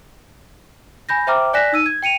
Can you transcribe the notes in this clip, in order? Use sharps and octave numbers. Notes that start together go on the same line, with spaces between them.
G#5 B5 G6 A#6
C5 E5 G5 A#5 D6 F6
D5 G#5 F#6 A#6 B6 E7
D#4 E6 D#7
G#6
G5 C#7 D#7 F7